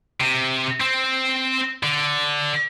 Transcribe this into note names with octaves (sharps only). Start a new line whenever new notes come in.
C3
C4
D3